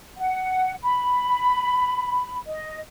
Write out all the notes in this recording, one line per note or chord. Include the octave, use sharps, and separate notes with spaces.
F#5
B5
D#5